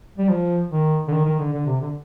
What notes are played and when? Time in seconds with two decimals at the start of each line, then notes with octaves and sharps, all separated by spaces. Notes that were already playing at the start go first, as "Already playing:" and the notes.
0.18 G3
0.29 F3
0.71 D#3
1.08 D3
1.11 D#3
1.25 D#3
1.39 D3
1.53 D3
1.67 C3
1.81 D3